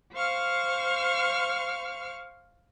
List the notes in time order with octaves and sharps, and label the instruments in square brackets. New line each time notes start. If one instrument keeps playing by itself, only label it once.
[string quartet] C5 F5 C#6 F6